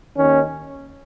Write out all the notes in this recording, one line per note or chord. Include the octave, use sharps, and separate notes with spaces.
D#2 D#3 C#4